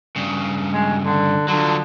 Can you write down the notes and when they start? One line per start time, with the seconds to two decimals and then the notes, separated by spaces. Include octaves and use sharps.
0.16 G2 C#3
0.73 G#3
1.04 D3
1.48 D3 F3 F#3